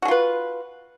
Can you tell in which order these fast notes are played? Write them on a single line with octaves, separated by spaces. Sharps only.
F#4 G#4 F4 B4